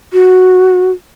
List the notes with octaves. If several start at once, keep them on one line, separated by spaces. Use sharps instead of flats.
F#4